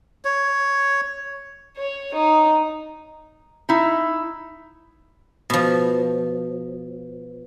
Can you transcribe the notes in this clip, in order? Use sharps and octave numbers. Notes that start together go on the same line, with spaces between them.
C#5
C#5
D#4
D#4 E4
B2 F3